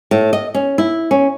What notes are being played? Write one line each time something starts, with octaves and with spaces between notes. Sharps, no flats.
A2
D#5
C#4
E4
C#4